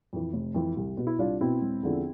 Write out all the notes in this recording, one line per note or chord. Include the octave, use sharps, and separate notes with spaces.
F2 E3
F1
F2 E3
C2
B2
E4
C2 D4 F4
B2 C4 E4
E1
E2 D3 F3